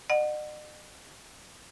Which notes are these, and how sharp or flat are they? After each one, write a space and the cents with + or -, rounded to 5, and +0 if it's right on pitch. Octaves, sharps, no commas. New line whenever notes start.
D#5 -45 F#5 +0